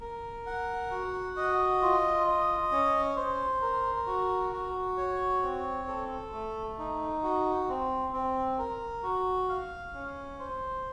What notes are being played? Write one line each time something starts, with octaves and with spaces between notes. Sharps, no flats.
A#4
F#5
F#4
D#5
F4
D#5
C#4
C5
A#4
F#4
F#4
C#5
C4
A4
A3
D#4
F#4
C4
C4
A#4
F#4
F5
C#4
C5